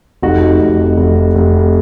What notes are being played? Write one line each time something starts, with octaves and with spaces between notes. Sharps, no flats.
F1 D#4 F#4
F1
F1
F1